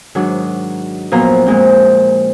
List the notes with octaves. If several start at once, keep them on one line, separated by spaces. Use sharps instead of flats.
G#2 D#3 F#3 D4
A#2 F3 F#3 B3 F4 A#5
A#2 G#3 C4